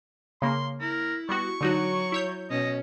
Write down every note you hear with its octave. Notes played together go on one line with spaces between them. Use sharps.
C#3 A#3 C6
E4 A#4
G3 B3 F#4 C#6
D3 F#3 D#4 F#4
E4 C#5 G6
B2 C#4 D#5